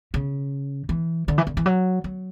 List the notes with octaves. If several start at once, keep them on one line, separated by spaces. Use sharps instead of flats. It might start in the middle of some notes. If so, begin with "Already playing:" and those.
C#3
E3
D3
E3
D3
E3
F#3
F#3